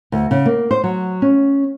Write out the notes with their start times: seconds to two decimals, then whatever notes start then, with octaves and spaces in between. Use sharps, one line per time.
0.12 D2
0.31 C#3
0.46 A#3
0.71 C5
0.84 F#3
1.22 C#4